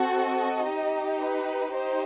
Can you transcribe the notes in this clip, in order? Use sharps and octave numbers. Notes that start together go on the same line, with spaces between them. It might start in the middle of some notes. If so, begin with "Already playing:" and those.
Already playing: C4 F#4 A4
D#5
D#4 G4
B4
D#4 G4 C5